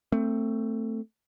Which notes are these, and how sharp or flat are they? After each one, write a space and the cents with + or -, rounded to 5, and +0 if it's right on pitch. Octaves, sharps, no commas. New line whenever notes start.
A3 +20 C4 +0